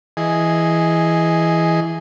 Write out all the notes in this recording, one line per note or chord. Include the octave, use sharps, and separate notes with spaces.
E3 G#4 D#5